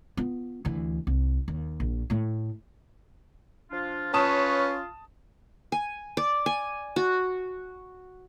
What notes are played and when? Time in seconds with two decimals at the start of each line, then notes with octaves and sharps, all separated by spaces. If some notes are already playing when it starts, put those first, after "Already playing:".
0.17 B3 F4
0.65 D2 E3
1.07 C2
1.48 D#2
1.80 A#1
2.10 A2 A3
3.70 F3 D4 F4
4.14 C#4 F4 B4 C#5 A5 D#6 E7
5.72 G#5
6.17 D5
6.46 G#5
6.96 F#4